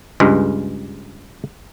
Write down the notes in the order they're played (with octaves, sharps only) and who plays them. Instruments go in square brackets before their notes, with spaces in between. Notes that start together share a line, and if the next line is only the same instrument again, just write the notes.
[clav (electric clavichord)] C#2 G2 G#3